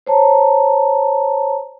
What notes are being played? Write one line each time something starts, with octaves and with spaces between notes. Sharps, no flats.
C5 C#5 A5 A#5